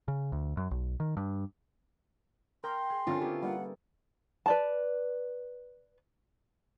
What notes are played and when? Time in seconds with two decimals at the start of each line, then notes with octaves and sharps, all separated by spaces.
0.08 C#3
0.32 D2
0.57 F#2
0.71 B1
1.00 D#3
1.17 G2
2.64 A#4 G5 A#5 C6
2.90 G#4
3.07 D3 C4 C#4 F4 A4 A#4 A5
3.21 B3 E4 G4
3.43 G3 A#3 F#5
4.46 B4 D5 A5